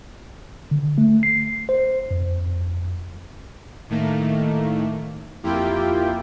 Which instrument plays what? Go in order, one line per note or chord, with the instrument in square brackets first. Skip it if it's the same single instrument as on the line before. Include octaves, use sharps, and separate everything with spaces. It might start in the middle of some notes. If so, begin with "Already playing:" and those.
[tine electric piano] D3
A3
C7
C5
F2
[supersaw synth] A2 D#3 A3 A#3
F2 A#3 E4 F4 G4 G5